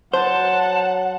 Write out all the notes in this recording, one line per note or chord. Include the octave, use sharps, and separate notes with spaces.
F#3 C5 F#5 A5